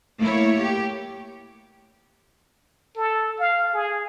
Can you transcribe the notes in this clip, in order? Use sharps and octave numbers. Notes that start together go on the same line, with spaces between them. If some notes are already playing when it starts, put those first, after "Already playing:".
A3 A#3 E4 C#5
G4
A4
F5
G#4